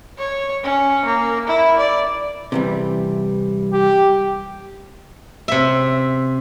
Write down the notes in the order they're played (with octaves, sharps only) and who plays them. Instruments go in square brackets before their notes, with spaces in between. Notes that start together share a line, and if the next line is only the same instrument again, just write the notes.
[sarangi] C#5
C#4
A#3
E4
D5
[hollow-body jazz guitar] C3 E3 G3
[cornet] G4
[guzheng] C3 E5